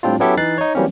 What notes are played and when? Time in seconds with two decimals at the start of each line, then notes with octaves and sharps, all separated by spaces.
0.03 A2 G3 C4 D4 F4
0.20 F#3 B3 C#4 E4 G4 A4
0.37 E3 D#4 F#6 A6 C7
0.58 D#4 C#5
0.75 E3 F#3 G3 A#3 C4 C#4